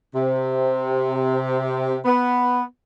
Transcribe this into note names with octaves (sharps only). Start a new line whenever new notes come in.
C3
B3